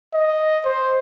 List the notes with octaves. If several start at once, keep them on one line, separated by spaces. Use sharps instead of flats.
D#5
C5